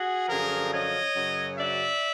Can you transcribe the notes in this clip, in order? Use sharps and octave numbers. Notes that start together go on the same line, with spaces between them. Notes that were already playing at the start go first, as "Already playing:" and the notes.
Already playing: F#4 G#4
F#2 D3 F3 G#4 A#4
C#5 D#5
F#2 C#3 F#3
D5 E5